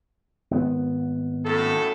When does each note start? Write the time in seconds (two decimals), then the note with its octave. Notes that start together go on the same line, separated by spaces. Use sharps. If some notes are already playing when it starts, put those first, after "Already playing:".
0.51 G#1 B3
1.45 F#2 A2 A4